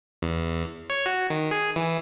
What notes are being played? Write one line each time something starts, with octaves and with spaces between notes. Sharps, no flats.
E2
C#5
F#4
D#3
G#4
E3